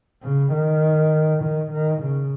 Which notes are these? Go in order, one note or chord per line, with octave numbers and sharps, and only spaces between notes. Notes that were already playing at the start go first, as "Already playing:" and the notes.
C#3
D#3
D#3
D#3
C#3